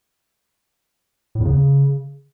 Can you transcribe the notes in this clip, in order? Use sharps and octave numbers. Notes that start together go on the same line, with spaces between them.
A2
E2
C#3